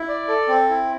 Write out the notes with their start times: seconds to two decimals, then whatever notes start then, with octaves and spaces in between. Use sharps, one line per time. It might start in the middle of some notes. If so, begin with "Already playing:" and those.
Already playing: E4
0.09 D5
0.28 A4
0.48 C4
0.70 E4